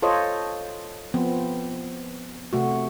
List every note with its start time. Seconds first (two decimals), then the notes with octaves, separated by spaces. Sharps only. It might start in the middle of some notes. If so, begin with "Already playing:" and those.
0.02 F4 A4 C5 C#5 D#5
1.14 F3 B3 C4
2.53 C3 A3 F#4